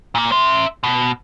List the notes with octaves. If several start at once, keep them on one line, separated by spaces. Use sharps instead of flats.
A#2 A#3
E5 C6
B2